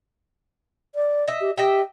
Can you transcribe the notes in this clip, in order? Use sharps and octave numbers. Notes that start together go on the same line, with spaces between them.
D5
D#5 E5
G4
G4 D#5 E5 G5